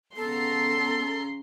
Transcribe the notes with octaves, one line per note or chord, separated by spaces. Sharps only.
C#3 B3 A4 A#5 C6 C7